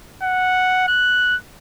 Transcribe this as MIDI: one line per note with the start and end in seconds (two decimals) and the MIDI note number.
0.23 0.87 78
0.88 1.36 90